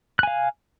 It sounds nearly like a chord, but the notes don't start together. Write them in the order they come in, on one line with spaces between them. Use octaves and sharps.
F#6 G#5 F5